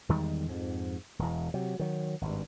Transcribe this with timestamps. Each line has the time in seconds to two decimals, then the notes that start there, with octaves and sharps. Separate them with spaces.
0.09 E2 D#3 G3 G#3
0.49 F2 G#2
1.19 E1 E2
1.54 C3 F#3
1.79 D#3 F#3
2.21 G#1 G2